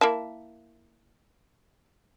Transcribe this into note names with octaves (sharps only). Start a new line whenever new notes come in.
A#3 E4 A5